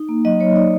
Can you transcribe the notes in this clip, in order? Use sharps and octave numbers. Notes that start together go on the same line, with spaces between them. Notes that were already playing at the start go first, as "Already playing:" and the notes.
Already playing: D#4
A#3
F#3 D#5
F#3 C#5
D#4 D5